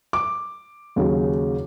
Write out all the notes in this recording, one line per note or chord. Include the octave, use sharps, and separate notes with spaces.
D6
D#2 C#3 F#3